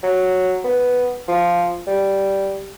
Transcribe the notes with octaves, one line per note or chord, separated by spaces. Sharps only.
F#3
B3
F3
G3